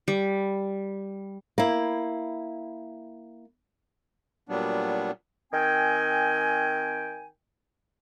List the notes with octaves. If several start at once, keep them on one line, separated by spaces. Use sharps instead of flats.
G3
A#3 E4
A#2 F#3 G3 B3 D4
D#3 C4 G5 G#5